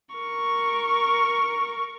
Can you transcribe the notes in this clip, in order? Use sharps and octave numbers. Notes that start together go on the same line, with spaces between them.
A#4 C#6